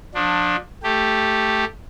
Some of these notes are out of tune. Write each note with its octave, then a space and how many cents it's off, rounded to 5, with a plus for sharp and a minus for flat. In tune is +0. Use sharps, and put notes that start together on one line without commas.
F3 +35 D4 +15
A3 +0 G4 +0